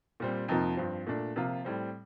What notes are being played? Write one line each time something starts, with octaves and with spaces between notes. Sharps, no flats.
A#2 G3 C4
F2 C3 F3 A#3 D#4
G2 F3 C4
A#2 A3 D4
C3 F3 A#3 F4
A2 G3 C4